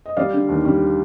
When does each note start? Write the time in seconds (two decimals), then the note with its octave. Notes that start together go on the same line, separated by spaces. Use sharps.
0.06 D#5
0.17 G3 D5 F5
0.33 D3
0.49 D#2
0.65 G3